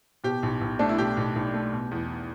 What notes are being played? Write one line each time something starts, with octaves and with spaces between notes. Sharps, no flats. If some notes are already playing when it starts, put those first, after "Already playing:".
B2 G4
B1
B1
A3 D4
E4
B2 G4
B1
B1
A3
B2
E2